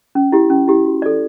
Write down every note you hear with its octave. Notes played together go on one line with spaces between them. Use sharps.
C#4
E4 G4
C#4
E4 G4
F#4
A4 D5